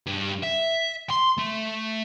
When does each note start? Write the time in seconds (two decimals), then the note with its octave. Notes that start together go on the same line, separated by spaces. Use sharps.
0.07 G2
0.43 E5
1.10 C6
1.38 A3